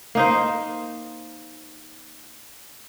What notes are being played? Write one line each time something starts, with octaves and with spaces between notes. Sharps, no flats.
A#3 D#4 C5